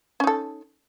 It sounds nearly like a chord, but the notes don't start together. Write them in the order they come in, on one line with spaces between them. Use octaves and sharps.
C#4 D#4 A4